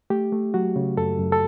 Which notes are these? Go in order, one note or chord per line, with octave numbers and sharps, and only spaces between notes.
A3 G4
A3
F#3 F#4
C#3
F#2 A4
F#2
A4